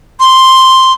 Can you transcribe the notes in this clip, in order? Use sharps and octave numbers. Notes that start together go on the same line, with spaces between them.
C6